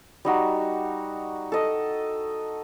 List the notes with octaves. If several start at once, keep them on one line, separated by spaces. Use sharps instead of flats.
G3 D#4 F#4
A4 D#5